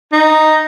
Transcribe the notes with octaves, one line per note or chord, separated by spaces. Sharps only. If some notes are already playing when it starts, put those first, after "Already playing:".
D#4